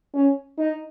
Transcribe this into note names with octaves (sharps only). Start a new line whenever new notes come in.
C#4
D#4